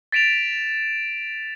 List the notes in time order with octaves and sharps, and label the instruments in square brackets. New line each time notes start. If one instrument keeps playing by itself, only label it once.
[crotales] A6 B6 D7 E7 F7